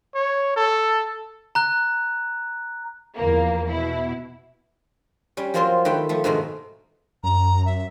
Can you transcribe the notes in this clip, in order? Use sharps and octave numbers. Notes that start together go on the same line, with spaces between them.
C#5
A4
A#5 F#6
E2 F3 A#3
B2 E4
G3 C#4
F3 F#3 A#3 C4 F4 C5
D#3 A3 B4 G5 C6
F3 A3
G#2 B2 D#3 A3 A#3
F#2 A#5
E5